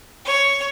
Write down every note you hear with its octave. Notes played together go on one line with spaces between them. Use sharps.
C#5